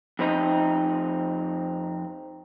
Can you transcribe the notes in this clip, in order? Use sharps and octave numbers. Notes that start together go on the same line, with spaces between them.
F2 C4 D#4